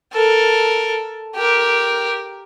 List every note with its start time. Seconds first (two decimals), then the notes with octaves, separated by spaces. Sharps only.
0.13 A4 A#4
1.35 G4 A#4